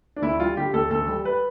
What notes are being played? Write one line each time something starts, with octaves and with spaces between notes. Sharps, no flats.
D4
D2 E4
G3 F4
D3 G4
D2 A4
D2 A4
G3
B4